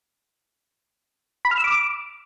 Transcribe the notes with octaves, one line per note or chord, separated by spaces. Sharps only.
B5
F6
E6
D6